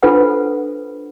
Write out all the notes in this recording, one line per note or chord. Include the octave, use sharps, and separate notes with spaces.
D4 F4 A4 B4 C5 F#5